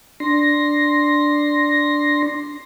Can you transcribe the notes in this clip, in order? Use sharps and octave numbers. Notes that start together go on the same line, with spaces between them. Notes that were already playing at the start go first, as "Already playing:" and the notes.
D4 C6 A#6